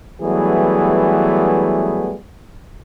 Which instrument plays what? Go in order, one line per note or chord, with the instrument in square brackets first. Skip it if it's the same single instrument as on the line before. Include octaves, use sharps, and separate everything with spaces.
[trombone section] E3 F#3 G3 A3 B3 G#4